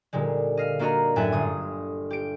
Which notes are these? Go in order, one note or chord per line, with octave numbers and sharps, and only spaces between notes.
A#2 D3 G3 G#3
D#5 F5
A#3 D4 F#4 D#5 F5 A#5
F#2 A2 E5 G5 G#5 F#6
G1 D#6
G4 D7